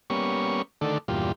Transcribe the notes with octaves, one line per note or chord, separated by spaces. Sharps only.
G3 A#3 B3 C#4 C#6
D3 D#3 A3 A4 D5
E2 G2 A#2 F4 G4